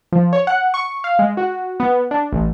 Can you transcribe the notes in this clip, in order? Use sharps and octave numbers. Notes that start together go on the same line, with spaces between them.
F3
C#5
F#5
C#6
F5
G#3
F#4
B3
D4
A1